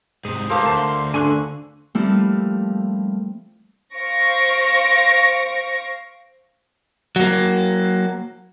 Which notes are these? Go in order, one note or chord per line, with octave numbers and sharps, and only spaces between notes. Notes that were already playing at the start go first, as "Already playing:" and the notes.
G#2 C3 G#4
A2 A#3 G4 A4 C5
D2 C5 F5 A5
C6
D3 G#5 C#6 F#6
F3 G3 A3 A#3 C4 E4
C5 F5 C#6 A#6 D7
F#3 A#3